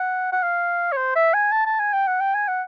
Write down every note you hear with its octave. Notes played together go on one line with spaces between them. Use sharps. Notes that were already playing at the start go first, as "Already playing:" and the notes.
Already playing: F#5
F#5
F5
C#5
C5
E5
G#5
A5
A5
G#5
G5
F#5
G5
G#5
F#5